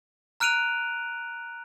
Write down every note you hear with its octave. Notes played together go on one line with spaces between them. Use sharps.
A#5 F6 F#6 D7 D#7 F7